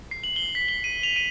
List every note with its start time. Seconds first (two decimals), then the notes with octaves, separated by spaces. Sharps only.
0.11 C7
0.24 F#7
0.36 G7
0.55 B6
0.68 G7
0.84 D#7
1.03 F7
1.16 D#7